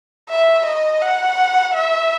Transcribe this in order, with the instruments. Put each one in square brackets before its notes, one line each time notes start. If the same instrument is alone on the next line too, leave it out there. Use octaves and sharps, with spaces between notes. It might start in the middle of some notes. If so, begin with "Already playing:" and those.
[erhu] E5
D#5
F#5
E5